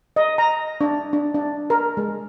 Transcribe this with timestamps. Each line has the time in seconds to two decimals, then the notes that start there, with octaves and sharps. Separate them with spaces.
0.16 D#5
0.38 A#5
0.81 D4
1.13 D4
1.34 D4
1.70 A#4
1.97 G#3